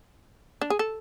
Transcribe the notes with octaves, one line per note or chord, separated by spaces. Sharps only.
D4
G#4
A4